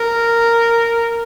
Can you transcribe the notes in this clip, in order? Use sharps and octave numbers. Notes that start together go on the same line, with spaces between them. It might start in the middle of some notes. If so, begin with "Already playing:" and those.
Already playing: A#4